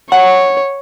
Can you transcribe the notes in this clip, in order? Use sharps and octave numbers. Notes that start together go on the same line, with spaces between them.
C#5 F#5